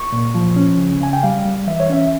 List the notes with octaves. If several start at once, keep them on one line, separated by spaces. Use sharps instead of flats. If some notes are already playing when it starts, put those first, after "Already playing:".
Already playing: C#6
A#2
F3
C#4
C#3
C#3 G#5
G5
G3 F5
G3
E3 E5
C#5
C#4 E5